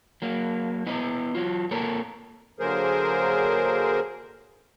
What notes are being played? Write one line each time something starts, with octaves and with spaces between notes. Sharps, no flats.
F#3 A#3
B3 E4 D#5
F#3 F4
A#3 A4 A#4 C#5
D3 F#3 A#3 G#4 A#4 C5